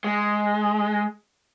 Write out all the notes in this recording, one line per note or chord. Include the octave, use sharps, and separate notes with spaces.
G#3